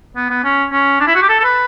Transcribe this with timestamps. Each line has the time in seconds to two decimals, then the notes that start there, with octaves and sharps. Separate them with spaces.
0.16 B3
0.30 B3
0.44 C#4
0.72 C#4
1.00 D4
1.07 E4
1.15 F#4
1.22 G4
1.29 A4
1.39 A4
1.44 B4